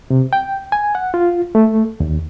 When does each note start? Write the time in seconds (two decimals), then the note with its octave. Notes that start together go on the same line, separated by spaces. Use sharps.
0.10 C3
0.33 G5
0.72 G#5
0.95 F#5
1.14 F4
1.55 A3
2.00 D#2